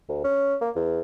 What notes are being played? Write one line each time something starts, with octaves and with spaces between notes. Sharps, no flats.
D2
C#4
A#3
E2